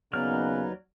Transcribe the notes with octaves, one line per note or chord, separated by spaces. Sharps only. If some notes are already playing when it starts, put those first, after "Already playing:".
D#2 C#3 F#3 B3 D#4 B4 D5 F6